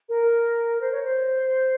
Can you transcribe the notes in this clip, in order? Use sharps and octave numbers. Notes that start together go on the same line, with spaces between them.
A#4
C5
C#5
C5